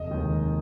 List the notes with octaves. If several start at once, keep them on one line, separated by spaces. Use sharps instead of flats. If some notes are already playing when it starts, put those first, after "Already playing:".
Already playing: F1 D#5
D#2 D#3 G#3
F1